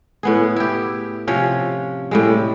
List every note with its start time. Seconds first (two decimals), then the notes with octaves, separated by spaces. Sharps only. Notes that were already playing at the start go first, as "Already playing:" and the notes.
0.23 A2 B3 G#4
0.56 E4 G4
1.27 C3 F3 C#4 C#5
2.11 A2 G3 G#3